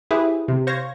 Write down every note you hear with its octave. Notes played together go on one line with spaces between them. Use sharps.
E4 G4 G#4 B4 C5 E5
C3
C5 C#5 F5 C#6 G#6 A#6